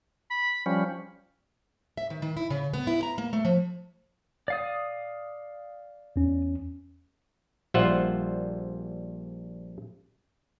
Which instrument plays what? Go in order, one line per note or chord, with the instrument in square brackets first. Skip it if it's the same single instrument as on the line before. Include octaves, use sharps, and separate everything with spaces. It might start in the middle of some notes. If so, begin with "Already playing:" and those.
[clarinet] B5
[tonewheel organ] F3 G3 C#4 [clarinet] B5
[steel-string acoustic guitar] E5
D#3
D#3
E4
C#3
B3
E4
A#5
A#3
A3
F3
[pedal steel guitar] D5 F5 D#6
[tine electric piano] E2 C#4
[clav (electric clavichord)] A#1 G3 F4 C5 E5 F#5